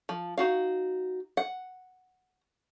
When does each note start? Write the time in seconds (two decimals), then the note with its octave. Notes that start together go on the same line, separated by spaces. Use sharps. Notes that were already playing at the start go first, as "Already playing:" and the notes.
0.09 F3
0.38 D#4 F#4 F5
1.37 F#5